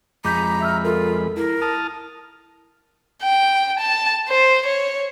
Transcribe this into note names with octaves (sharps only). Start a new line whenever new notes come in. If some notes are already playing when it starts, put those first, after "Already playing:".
F2 G#3 A#5 B5 D6 G6 B6
E5 E6 F6
F4 A4 A#4
E4 A#4
A5 D#6 F6
G5
A5
C5
C#5